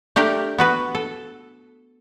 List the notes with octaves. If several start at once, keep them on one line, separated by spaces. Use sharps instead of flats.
A3 D4 G4 A#4
B3 F#4 B4
A4